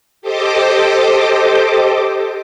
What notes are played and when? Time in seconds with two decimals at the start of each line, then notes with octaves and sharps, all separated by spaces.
0.22 G4 A4 C5 D#5 D6